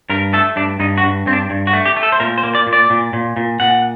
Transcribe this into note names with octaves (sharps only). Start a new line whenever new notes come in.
G2 A#4
A3 A4
G2 D4
G2 D#4
F#4
G2
G2 C4
D4
G2
F#4
A3
G4
A3
A4
C5
A#2 A#4
C5
A#3
D5
A#2
D5
A#2
A#2
A#2
A#2 F#5